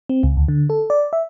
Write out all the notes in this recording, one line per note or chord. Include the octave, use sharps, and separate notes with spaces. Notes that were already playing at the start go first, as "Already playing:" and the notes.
C4
C#2
D2
D3
A4
D5
E5